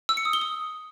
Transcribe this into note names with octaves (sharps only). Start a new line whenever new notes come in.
E6
C#7
D#6
G7
D#6